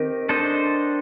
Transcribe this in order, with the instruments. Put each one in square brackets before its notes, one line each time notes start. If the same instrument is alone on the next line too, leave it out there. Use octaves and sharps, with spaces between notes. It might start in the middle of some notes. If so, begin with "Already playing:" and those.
Already playing: [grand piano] D#3 [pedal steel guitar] C4 D#4 G4
[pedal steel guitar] D4 A4 C5 D#5